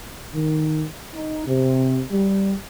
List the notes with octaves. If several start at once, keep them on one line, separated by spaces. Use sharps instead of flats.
D#3
D#4
C3
G3